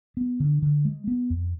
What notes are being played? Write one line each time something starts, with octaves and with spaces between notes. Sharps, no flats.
B3
D3
D3
G#3
B3
F2